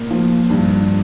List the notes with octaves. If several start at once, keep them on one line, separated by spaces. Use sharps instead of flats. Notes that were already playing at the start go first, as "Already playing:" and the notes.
Already playing: A#2 A#3
F3
G2